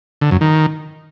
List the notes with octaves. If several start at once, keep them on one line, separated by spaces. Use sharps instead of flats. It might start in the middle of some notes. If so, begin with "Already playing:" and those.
D3
F#2
D#3